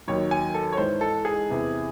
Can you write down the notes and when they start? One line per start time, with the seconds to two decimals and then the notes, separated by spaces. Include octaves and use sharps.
0.07 D#2 D#3 F#3 C#5
0.31 G#5
0.54 A4
0.72 C#5
0.77 G#2 E3 C5
1.01 A4
1.25 G#4
1.49 E2 C3 E3